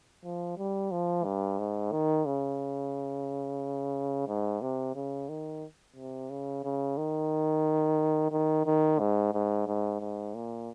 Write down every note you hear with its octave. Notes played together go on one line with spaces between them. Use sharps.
F3
G3
F3
G2
G#2
D#3
C#3
G#2
C3
C#3
D#3
C3
C#3
C#3
D#3
D#3
D#3
G#2
G#2
G#2
G#2
A#2